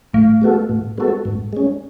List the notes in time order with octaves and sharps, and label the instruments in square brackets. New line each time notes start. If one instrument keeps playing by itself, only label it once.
[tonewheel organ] A2 [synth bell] A3
[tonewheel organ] G#3 B3 F#4 A4
A2
G#3 B3 F#4 A4
G#2
G#3 C#4